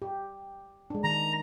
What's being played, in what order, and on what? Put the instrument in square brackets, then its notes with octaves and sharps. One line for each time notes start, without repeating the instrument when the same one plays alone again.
[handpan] G4
G#3 D4
[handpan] D#3 [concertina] A#5